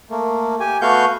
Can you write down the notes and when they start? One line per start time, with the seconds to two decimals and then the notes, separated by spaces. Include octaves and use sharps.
0.10 A3 A#3
0.60 G4 G#5
0.82 A3 B3 F#4 F5 C#6 G6